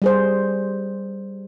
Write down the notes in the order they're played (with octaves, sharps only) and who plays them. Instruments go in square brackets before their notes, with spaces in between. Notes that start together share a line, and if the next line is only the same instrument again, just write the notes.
[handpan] G3 G#4 C5